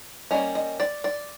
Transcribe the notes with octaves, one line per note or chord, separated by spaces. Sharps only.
G3 A#3 C#4 D#5
D#5
D5
D5